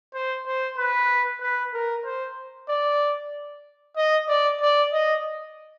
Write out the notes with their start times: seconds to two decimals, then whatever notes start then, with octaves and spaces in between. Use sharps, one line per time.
0.14 C5
0.46 C5
0.78 B4
1.41 B4
1.73 A#4
2.05 C5
2.69 D5
3.96 D#5
4.28 D5
4.61 D5
4.92 D#5